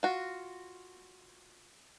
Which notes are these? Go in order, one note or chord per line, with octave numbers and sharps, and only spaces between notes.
F4 F#4